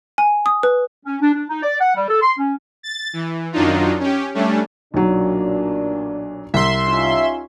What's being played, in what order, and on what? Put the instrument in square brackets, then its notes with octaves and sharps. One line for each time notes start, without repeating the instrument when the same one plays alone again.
[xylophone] G#5
D#6
B4
[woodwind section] C#4
D4
D4
D#4
D5
F#5
G3
A4
C6
C#4
[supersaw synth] A6
E3
F#2 D#3 F#3 D4 D#4 F4
C#4 G4
G3 A3 C#4 D4
[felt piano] B1 F#3 [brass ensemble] A#2 D4
[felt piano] C2 [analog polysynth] E5 C6
[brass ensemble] C#4 D#4 F4